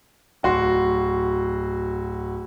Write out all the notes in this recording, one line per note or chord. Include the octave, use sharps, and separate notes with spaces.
D1 F#4 C6